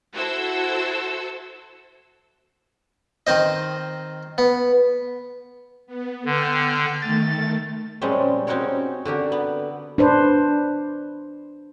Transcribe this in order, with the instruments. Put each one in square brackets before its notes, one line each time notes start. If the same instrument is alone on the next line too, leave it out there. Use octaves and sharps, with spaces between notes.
[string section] E4 F#4 A4 C5 E6
[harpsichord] D#3 C4 C5 D#5
B3
[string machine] B3
[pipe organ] D3 [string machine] G5 F6 G6
[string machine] D#3 A3 [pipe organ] A6
[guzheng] A#2 F3 G3 G#3 C4 C#4
C4 C#4 D#4 F#4 A#4 C#5
D3 F#4 G4 A#4
B3
[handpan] D4 B4 C5